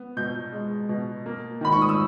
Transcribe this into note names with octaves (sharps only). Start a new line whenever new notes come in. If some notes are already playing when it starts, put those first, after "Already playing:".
Already playing: B3
B2 G6
G#3
B2
A#3
D#3 B5
C#6
D#6
E6